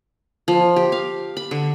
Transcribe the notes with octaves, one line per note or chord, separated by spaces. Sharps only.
F3
G4
F5
B5
D3